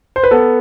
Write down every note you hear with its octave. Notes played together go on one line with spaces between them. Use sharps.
C5
B4
B3 A4